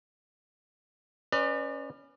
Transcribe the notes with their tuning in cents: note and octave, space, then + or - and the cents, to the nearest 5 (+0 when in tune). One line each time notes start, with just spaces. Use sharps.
C#4 +0 B4 +0 D5 +40